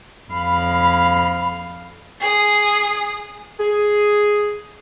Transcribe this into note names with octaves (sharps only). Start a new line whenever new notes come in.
F2 F5 B5
G#4 D#6
G#4